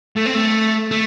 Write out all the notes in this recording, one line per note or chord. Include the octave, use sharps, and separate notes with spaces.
A3
C4
A3
A3